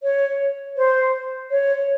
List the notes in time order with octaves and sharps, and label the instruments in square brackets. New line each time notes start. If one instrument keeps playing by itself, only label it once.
[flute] C#5
C5
C#5